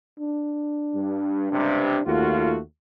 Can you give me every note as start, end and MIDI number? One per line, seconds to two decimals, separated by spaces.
0.20 2.05 62
0.94 1.47 43
1.51 1.98 37
1.51 1.98 43
1.51 1.98 48
2.06 2.62 39
2.06 2.58 57
2.06 2.58 65
2.06 2.58 66